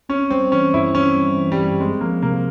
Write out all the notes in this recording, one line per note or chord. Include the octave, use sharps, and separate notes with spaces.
C4 C#4
G3 C4
E3 C#4
G2 E4
C4 C#4
G3
E3
G3
G2
G#3 C4
F3 A#3
C3 A#3